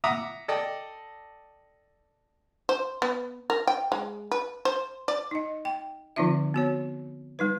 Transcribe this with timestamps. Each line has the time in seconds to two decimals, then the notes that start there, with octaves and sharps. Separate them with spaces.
0.04 E5 F#5 A#5 D6 D#6
0.48 A4 D5 D#5 G5
2.69 C5
3.02 B3
3.50 A#4
3.67 G5
3.92 G#3
4.32 B4
4.65 C5
5.08 D5
5.31 D#4 D#5
5.65 G5
6.16 D3 F3 C4 D#4 F4 E5
6.54 B3 F#4 C#5
7.39 G3 D#4 B4